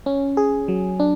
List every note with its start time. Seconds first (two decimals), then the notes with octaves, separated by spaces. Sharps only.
0.06 C#4
0.37 G#4
0.68 F#3
1.00 D4